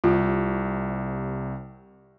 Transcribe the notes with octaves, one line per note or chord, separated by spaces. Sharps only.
C2 C3 F4